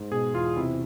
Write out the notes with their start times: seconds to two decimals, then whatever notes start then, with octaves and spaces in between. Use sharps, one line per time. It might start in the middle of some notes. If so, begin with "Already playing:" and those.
Already playing: G#2
0.12 B2 G#4
0.34 E2 F4
0.57 C3 E4